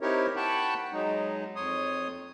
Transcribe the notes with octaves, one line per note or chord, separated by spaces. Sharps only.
C4 D#4 E4 G4 A#4 C#5
F#5 G5 A5 B5 C#6 F#6
F#3 G#3 D#4
F2 C#5 C6 D#6